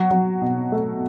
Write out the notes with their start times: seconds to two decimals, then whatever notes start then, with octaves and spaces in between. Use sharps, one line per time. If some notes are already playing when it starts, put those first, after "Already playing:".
Already playing: F#3 F#4
0.11 F#3
0.42 B2
0.72 A3